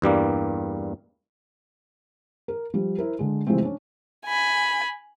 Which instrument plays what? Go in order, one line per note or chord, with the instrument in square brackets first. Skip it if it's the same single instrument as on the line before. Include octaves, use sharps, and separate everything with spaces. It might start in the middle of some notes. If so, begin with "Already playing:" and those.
[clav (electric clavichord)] E2 G2 G3 A#3
[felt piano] A#4
F3 G3
E4 A#4 C5
D3 G#3
C3 E3 F3 G#3 A3 C4
C#4 D4
[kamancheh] G#5 B5